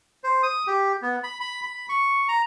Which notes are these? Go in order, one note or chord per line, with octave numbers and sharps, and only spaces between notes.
C5
D#6
G4
B3
B5
B5
B5
C#6
A#5